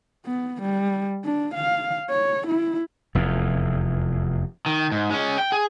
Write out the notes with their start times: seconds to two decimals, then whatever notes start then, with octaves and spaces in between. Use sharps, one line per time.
0.26 B3
0.62 G3
1.24 D4
1.54 F5
2.10 C#5
2.47 E4
3.15 F1 E2
4.66 D#3
4.92 G#2
5.11 G#3 C#4
5.38 G5
5.52 G#4